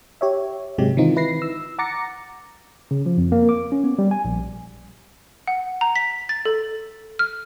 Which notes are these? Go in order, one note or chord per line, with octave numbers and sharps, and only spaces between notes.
G4 C#5 E5
G#2 C3 F#3 G#3 G4
D#3 E3 C4 D#4 F4
E4 B4 A#6 C7
E6
F#5 A#5 D6 A6 A#6 C#7
C#3
F3
F2
A#3
D6
C#4
B3
G3
G#5
A#1
F#5
A#5
B6
A6
A4
F6